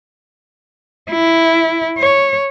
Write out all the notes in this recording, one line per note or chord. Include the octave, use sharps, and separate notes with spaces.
E4
C#5